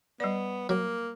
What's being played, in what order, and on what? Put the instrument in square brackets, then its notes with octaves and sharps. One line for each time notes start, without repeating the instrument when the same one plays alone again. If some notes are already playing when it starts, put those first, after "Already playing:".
[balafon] G3 D5 [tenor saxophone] B3
[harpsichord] F#3 [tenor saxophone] A#3